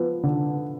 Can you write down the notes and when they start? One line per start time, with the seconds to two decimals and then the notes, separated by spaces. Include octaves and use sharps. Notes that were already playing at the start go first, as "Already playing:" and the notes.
Already playing: F3 B3
0.23 D3